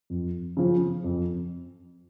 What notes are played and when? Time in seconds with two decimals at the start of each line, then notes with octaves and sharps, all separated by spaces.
0.10 F2
0.57 C#3 F3
1.04 F2